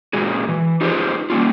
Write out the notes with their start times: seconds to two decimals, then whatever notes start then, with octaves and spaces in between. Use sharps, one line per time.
0.13 A#2 G#3 F#4 G#4
0.49 E3
0.81 D#4 F4 G4 G#4 B4 C5
1.30 G3 A#3 C#4 F4